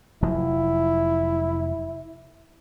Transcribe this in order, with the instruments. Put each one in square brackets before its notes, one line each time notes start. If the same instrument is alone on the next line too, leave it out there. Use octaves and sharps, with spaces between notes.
[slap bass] F1 F3 F#3 [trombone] E4